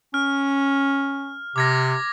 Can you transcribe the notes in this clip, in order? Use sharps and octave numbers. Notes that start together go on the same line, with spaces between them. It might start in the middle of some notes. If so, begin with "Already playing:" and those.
C#4 F6
C3 D6 G#6 A#6